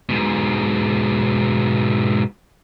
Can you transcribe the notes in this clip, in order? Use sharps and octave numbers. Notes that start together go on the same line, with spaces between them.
G#2 B2